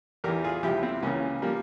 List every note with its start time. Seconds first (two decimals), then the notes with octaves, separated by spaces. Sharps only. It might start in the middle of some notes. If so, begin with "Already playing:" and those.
0.24 E2 E3 G4 A#4
0.44 F4 G#4
0.63 C#2 C3 F3 E4 G4
0.83 C4 E4
1.02 C#2 C#3 E3 A#3 C#4
1.42 F3 G3 A#3